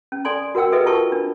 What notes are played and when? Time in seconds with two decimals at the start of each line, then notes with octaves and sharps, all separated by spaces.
0.12 C#4
0.25 A4 D5 G#5 C6
0.55 F#4 A#4 F#5 G5 E6
0.72 F#4 G#4 A4 B4 D#5 E5
0.86 F4 G4 A#4 A5 C#6
1.12 D4